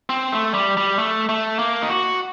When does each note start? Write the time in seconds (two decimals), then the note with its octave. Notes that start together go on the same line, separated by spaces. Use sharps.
0.10 C4
0.32 A3
0.54 G3
0.77 G3
0.99 A3
1.29 A3
1.59 A#3
1.82 D#4
1.88 F#4